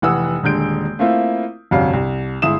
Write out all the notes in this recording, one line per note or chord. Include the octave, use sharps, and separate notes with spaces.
F1 E3 F#5 D#6 E6
D#1 D3 G#3 G6 D7
A3 A#3 C4 E4 F4
G1 C2 F2 C#4 F#4 F5
C2
G1 G#3 E4 E5 D#6 E7